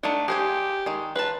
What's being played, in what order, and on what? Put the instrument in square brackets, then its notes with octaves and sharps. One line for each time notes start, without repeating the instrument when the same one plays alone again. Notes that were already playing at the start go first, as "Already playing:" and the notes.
[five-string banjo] A3 D#4 F#5 [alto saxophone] D4
[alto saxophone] G4 [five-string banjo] G#4 C5 G#5
[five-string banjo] D#3 G#3
[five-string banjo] F4 A5 [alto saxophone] B4